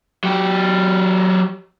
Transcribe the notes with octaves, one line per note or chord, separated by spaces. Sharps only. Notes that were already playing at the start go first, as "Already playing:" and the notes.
F#3 G4